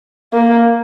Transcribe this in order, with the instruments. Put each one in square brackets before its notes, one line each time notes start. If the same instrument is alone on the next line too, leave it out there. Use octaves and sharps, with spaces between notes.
[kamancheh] A#3